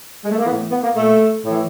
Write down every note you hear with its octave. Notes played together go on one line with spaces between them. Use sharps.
G#3
A3
A#3
A2 E3 B3
B3
A#3
A#2 A3
A2 E3